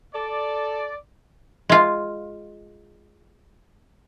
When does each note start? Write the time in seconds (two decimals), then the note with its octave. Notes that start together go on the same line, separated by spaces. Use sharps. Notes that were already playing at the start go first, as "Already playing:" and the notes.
0.15 A4 D5
1.69 G#3 F4